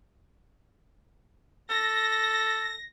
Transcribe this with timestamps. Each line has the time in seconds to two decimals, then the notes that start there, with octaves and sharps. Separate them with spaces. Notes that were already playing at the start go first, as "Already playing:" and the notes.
1.70 A4 A#6